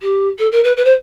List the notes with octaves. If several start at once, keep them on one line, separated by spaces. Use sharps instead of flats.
G4
A4
A#4
B4
B4
C5